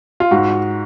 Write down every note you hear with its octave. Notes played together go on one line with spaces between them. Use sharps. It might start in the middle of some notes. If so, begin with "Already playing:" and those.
F4
G#2 F#4